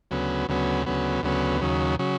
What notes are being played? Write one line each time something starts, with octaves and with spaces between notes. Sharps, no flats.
D2 C#3 F#3 B3
D2 C#3 F#3 B3
D2 C#3 F#3 B3
D2 C#3 F#3 B3
D#2 C#3 F#3
C#3 F#3